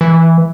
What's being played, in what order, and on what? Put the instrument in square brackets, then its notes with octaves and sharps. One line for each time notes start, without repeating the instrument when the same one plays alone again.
[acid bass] E3